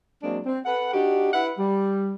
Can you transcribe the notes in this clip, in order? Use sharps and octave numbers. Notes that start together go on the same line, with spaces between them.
F#3 G#3 A#3 C4 D4
C4
A4 B4 F#5
D4 D#4 F#4 G4
E4 B4 E5 F#5
G3